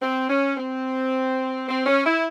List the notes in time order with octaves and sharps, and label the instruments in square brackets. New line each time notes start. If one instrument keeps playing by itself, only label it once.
[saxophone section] C4
C#4
C4
C4
C#4
E4